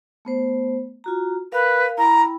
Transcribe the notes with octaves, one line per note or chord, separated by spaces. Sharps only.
A3 B3 C5
F4 F#4 A#5
A#4 B4 F5
E4 G5 A#5 B5